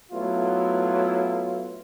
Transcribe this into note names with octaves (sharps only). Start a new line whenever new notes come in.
F#3 A3 B3 E4 F4